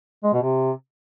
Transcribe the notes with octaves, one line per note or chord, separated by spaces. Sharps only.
G#3
B2
C3